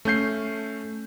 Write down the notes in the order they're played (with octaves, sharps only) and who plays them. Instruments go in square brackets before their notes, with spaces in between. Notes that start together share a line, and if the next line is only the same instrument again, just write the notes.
[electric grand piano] A3 C#4 G6 C7